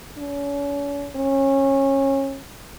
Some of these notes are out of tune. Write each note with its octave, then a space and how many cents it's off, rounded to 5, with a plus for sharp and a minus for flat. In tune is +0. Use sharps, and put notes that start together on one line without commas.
C#4 +40
C#4 -25